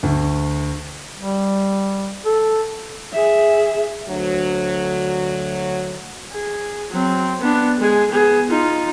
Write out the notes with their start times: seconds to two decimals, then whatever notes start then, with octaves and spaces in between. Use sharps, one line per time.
0.03 D2
1.19 G3
2.25 A4
3.12 G#4 E5
4.07 D2 F#3
6.32 G#4
6.91 F#3 C4
7.40 B3 D4
7.78 G#3 G#4
8.11 B3 G#4
8.50 D#4 F4